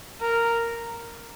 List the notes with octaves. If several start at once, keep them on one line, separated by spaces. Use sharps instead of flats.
A#4